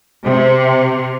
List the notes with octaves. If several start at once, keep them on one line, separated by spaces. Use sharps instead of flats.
C3